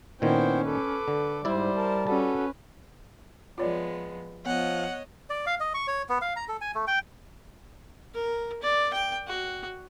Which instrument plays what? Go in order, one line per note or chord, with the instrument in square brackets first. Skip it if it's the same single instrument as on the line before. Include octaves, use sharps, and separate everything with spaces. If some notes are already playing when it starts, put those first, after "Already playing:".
[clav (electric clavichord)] A#2 D#3 [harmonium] B3 E4 C5 [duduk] C#4 [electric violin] G5
[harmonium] A4 [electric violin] B4 D6
[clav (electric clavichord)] D3
[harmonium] G#2 [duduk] G3 [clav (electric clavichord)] E4 D5 [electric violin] C5
[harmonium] A#4 A5
[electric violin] C#4 B4 [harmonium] F#4 A4 [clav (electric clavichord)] A5
[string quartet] F3 G#3 B3 [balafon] F4 C#5 D5
[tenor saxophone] F3 [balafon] B3 [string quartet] C#5 D#5 [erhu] F#5
[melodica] D5
F5
D#5
C#6
C#5
B3
F5
A#5
A4
G#5
A3
G5
[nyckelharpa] A#4
D5
G5
F#4